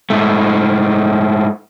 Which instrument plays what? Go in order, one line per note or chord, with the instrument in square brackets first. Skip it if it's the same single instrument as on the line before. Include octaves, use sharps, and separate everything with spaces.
[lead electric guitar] G#2 A3